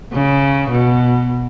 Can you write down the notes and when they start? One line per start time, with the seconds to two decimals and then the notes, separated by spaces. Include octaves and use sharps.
0.13 C#3
0.71 B2